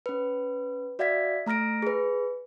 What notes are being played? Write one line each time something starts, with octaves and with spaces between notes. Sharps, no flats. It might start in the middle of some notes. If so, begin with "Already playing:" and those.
C#4 B4
F#4 D5 E5 F5 G#6 B6
A3 A#5 F6 A#6 D7
G#4 B4